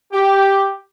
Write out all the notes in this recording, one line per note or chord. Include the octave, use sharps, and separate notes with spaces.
G4